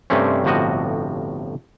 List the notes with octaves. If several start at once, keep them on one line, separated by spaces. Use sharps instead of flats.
G2 C3 A3 C4 C#4
G1 A2 C3 F3 F#4 D#5